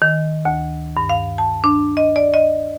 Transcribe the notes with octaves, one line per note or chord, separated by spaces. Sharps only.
D#3
D2
G2
F5
A5
D4
D#5
D5
D#5